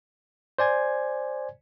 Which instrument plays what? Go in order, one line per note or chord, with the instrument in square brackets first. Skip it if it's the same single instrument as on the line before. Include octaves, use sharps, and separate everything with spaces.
[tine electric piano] C5 D5 G#5 G#6